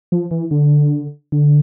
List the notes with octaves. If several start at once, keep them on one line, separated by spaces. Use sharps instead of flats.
F3
E3
D3
D3